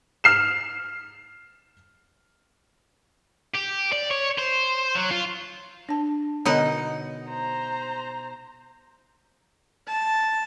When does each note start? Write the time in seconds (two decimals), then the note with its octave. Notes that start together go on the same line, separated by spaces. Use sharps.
0.24 F6 C7 E7
3.54 G4
3.92 D5
4.11 C#5
4.38 C5
4.96 F#3
5.11 F4
5.89 D4 A5
6.45 B2 D3 B3 D#4 C#5 F#5
7.29 C5 A#5
9.88 A5